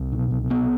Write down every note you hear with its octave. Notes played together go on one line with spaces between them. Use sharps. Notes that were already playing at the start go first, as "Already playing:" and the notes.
Already playing: C2
B2
C2
B2 B3